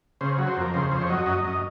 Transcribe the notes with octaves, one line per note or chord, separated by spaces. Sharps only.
C#3 C5
F#3
C5
F2 A#4
C#3 C5
F2 C5
C#5
F#3 D#5
F#2 D#5
F#2 D#5